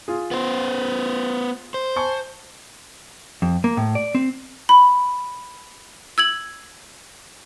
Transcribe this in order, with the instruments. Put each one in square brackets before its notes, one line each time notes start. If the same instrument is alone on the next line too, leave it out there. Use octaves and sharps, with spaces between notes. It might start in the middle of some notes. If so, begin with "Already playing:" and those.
[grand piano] F4 G#4
[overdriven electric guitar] B3 C5
C5
[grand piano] G#5 A5 C#6
[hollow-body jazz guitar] F2
A#3
A2
D5
C4
[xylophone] B5
E6 G#6 F#7